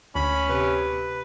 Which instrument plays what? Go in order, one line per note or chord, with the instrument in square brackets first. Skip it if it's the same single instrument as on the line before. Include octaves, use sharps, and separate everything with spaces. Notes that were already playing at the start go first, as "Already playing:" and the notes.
[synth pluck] D2 [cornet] C#4 [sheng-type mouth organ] B5
[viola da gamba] C3 [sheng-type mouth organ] B4